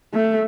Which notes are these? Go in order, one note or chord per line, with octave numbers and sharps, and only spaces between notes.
A3